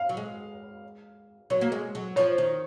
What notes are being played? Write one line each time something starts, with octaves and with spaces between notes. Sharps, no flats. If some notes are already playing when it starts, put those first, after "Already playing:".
Already playing: F5
F#3
G#3
F#3 C#5
A#3
G#3
F#3
F3 C#5
D#3